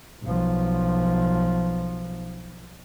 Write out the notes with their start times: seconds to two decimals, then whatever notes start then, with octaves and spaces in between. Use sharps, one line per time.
0.23 B1 F3